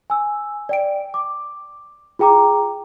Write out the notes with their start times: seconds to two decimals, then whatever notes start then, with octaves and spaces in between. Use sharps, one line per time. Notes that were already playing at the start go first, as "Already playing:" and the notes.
0.10 G#5 E6
0.69 D5 G5 D7
1.14 D6
2.19 F4 G#4 G5 A#5 D6